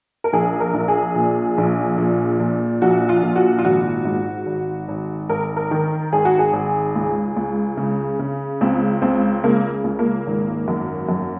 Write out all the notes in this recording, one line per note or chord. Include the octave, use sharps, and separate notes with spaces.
A#4
A#1 G#4
A#4
A#1
G#4
A#2
A#1
A#2
A#2
A#1 F#4
F4
A#2
F#4
F4
G#1 F#4
G#2
G#1
G#1
G#1 A#4
A#4
D#3
G#1 G#4
F#4
G#4
G#1
C#2
C#2
C#3
C#3
C#2 C4
C#2 C4
C#3 A#3
C#2
A#3
G#1
F#2
F#2